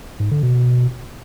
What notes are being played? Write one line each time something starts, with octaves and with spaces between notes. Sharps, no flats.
G#2
D3
B2